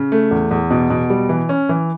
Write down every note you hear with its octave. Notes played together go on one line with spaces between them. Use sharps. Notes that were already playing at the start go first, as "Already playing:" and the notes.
Already playing: C#3
A3
E2
E2
B2
B2
G3
E3
C#4
E3